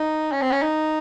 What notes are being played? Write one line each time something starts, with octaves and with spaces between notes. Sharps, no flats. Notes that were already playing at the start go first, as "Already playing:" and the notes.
Already playing: D#4
C#4
C4
C#4
D#4